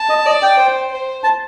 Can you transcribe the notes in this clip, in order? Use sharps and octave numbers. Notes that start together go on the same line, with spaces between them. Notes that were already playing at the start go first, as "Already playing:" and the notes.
Already playing: A5
D#5
D5 D#5
G5
C5
C5
A5